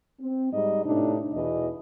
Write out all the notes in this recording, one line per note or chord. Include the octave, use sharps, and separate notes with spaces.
C4
G#2 G3 D#4 D#5
A2 C3 D4 D#4
E2 B2 E3 D#5